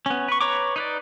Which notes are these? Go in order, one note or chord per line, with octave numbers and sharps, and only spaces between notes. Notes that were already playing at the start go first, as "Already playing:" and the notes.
B3 C#4
B4 C#6
B4 C#5 A#5 C#6 D6
D#4 B4 D5